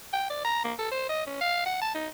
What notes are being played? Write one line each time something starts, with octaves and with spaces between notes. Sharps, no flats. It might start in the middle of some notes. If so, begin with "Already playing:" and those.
G5
D5
A#5
A#3
A4
C5
D#5
C#4
F5
F#5
A5
D#4